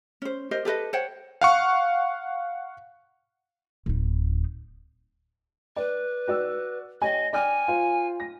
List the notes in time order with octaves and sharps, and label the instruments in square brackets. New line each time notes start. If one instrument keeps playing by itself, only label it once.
[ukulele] C#4 C5
G4 A#4 C5 D#5
G4 A4 B4 D#5
C5 C#5 F#5 G5
[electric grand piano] F5 F#5 C#6
[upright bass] D1 D#4
[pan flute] B4 [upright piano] D5
[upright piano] F#4 D5 E6
[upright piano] G4 C#5 G#5 [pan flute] D#5
[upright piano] D5 G5 F6 [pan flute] G#5
[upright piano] F4 C5
A#6